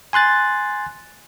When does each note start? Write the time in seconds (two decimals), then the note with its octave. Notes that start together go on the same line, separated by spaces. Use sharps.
0.13 G#5 C6 F#6 A6